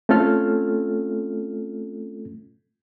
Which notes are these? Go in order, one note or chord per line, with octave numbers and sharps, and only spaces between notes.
A3 C4 C#4 F4 A4 F6